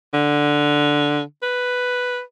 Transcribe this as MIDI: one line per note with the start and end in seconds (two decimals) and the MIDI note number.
0.14 1.21 50
1.42 2.21 71